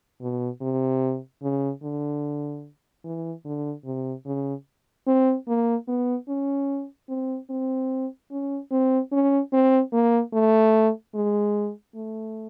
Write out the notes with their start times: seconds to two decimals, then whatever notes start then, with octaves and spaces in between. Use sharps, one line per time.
0.21 B2
0.61 C3
1.42 C#3
1.83 D3
3.04 E3
3.45 D3
3.85 C3
4.26 C#3
5.07 C4
5.48 A#3
5.88 B3
6.29 C#4
7.09 C4
7.50 C4
8.31 C#4
8.71 C4
9.12 C#4
9.52 C4
9.93 A#3
10.33 A3
11.14 G#3
11.95 A3